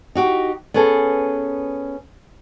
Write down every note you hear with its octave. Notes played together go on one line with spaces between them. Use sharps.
D#4 F#4 G4
B3 C#4 G#4 A4